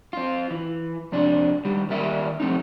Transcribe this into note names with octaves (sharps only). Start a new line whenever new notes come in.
C4 F4
E3
F2 C3 D4
D#3 G3
D#3 G3 A#3 E5
F3 A3 C4 D#4